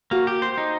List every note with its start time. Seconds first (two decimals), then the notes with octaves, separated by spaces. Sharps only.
0.11 A#3 F#4
0.27 G4
0.42 C5
0.58 D#4